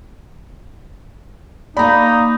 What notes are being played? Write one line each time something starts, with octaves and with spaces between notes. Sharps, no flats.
A#3 D#4 D5 A#5 B5